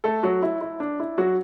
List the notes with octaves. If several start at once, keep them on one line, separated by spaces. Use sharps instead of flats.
A3 A4
F#3 F#4
E4
E4
D4
E4
F#3 F#4